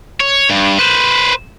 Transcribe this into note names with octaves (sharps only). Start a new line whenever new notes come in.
C#5
G2
B4 C5